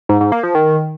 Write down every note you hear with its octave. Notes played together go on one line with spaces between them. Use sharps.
G#2
G#2
A#3
F3
D#3